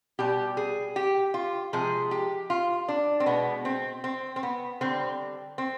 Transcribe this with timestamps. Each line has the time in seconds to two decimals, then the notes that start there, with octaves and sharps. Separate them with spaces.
0.19 B2 G3 G4
0.57 G#4
0.96 G4
1.34 F4
1.73 C3 F3 G#3 G#4
2.11 G4
2.50 F4
2.88 D4
3.20 C4
3.26 B2 G#3 B3
3.65 C4
4.04 C4
4.36 C4
4.43 B3
4.81 D3 G3 C4
5.58 C4